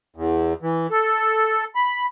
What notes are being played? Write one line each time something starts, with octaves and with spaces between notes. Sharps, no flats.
E2
E3
A4
B5